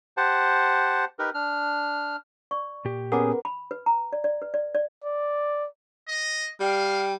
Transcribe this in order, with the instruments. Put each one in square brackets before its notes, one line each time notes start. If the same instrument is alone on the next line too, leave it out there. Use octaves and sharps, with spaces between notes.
[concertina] G4 C5 F#5 A5
D#4 G4 A#4 B4
D4 F6
[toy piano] D5 C#6
[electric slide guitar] A#2 G4
[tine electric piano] B3 C#4 G#4 [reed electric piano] A#4 B4 [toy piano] F#5 D6
[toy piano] B5
B4
A#5
D5
D5
B4
D5
D5
[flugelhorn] D5
[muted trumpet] D#5
[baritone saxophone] G3 [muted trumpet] F5 [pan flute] G5